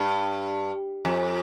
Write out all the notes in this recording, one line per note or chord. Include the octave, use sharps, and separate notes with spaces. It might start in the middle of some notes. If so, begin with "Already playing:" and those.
Already playing: G2
F2